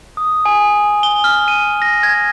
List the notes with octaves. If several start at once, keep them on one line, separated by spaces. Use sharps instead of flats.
D#6
G#5
G7
F6
D#7
A#6
G#6